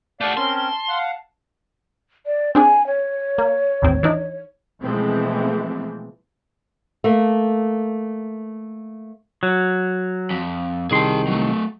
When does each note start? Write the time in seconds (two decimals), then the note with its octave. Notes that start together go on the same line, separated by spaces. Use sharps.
0.21 G3 A3 D5 F5 F#5 A5
0.37 C4 C#4 A#4 C6
0.89 F5 F#5
2.26 D5
2.55 C4 D4 G#4 G#5
2.87 C#5
3.38 A#3
3.82 A1 D#2 C4
4.03 E3 D4 D#4
4.83 B2 E3 F3 G#3 A3 C4
7.04 A3 A#3
9.43 F#3
10.31 F2
10.91 C2 D#3 G#4 A5 C6
11.27 F#3 A3